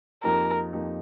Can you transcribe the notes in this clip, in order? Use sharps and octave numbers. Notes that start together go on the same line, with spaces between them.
F2 F3 A#3 D#4 G4 A#4
F2 F3 A#3 D#4 G4